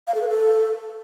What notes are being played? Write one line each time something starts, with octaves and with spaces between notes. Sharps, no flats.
F5
A4
B4
A4